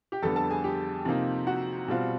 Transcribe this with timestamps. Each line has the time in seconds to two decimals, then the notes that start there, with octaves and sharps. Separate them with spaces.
0.12 G4 G5
0.22 F2 D3 G3 B3 A4 A5
0.36 A4 A5
0.50 G#4 G#5
0.64 G4 G5
1.05 C3 F3 A#3 D#4
1.47 F#4 F#5
1.88 B2 G3 C4 F4